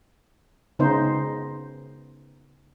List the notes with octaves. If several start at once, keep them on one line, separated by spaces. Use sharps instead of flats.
C#3 B3 D#4 C5